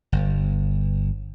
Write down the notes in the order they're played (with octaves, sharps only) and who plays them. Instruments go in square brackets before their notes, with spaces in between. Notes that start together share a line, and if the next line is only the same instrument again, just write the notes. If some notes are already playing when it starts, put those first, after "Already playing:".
[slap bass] G1